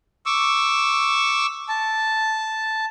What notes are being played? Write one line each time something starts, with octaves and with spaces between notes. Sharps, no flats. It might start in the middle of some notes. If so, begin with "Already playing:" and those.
C#6 D6 E6
A5